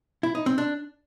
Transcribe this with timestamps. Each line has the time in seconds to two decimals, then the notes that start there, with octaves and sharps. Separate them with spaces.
0.23 E4
0.35 D#4
0.46 C4
0.58 D4